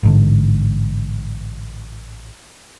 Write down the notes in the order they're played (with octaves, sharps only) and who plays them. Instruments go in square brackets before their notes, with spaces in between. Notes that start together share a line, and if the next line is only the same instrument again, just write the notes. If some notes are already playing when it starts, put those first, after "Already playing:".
[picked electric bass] A1 G#2 D3